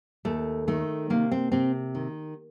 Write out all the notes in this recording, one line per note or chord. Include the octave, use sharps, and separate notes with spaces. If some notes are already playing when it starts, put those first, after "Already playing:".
D#2 A3
D#3 A3
C3 A#3
C4
C3 C4
D#3